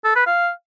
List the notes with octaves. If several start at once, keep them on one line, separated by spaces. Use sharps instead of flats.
A4
B4
F5